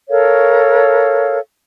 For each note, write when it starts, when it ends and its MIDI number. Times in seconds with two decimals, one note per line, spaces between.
0.09 1.39 69
0.09 1.39 70
0.09 1.39 73
0.09 1.39 77